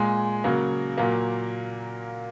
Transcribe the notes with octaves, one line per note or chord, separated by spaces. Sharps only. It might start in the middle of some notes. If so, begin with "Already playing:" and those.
Already playing: A#2 G#3 G#5
C#3 F#3 A#3
A#2 F#3 A#3